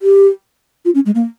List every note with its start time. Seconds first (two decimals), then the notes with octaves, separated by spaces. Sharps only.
0.02 G4
0.85 F4
0.95 C#4
1.06 G#3
1.15 A#3